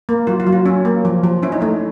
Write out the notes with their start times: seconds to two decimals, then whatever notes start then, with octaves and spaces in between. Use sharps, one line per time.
0.09 A#3
0.27 F#3 F4
0.40 F4
0.47 F#3
0.53 F4
0.66 C#4
0.85 A#3
1.05 F3
1.24 F3
1.43 C#4 E4
1.52 D#4
1.61 A3 E4